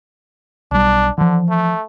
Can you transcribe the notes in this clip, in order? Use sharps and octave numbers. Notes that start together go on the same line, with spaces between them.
B1 G3 D4
D3 E3 F3
A3